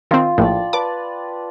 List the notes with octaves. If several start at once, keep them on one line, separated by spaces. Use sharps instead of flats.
D#3 C4 F4
A#1 A2 D5 G5 A5
B4 D5 A5 D6